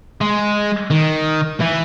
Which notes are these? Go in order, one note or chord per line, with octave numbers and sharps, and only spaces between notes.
G#3
D#3
E3